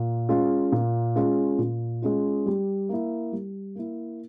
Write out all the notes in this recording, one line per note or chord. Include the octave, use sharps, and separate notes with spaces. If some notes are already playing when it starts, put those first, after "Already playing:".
Already playing: A#2
G#3 C#4 F4
A#2
G#3 C#4 F4
A#2
G#3 C#4 F4
G3
A#3 E4
G3
A#3 E4